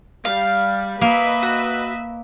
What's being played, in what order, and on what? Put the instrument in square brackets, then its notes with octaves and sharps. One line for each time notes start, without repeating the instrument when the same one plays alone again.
[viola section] G3 [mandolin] F5
[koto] A#3 [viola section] B4 D#5 E5
[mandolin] F#4